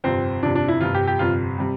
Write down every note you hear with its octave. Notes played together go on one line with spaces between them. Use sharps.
G1 F2 C3 C4
G1 F2 C3 D4
D4
E4
G1 F2 C3 F4
G4
G4
G1 F2 C3 F4
C3 G3